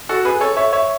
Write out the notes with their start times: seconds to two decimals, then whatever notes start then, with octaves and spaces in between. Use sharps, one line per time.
0.09 F#4 A4
0.25 G#4 B4
0.41 A4 C#5
0.57 C#5 E5
0.73 C#5 E5